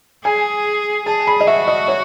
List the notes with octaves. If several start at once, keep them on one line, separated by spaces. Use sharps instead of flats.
G#4 G#5
G#4 A5
B5
D#5
F#4 E5
D#5
C#5